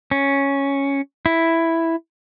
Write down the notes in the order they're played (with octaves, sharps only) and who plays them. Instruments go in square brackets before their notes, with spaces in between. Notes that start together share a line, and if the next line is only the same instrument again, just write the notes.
[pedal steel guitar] C#4
E4